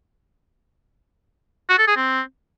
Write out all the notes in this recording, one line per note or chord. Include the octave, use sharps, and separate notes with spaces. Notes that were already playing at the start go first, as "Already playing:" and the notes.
F#4
A4
G#4
C4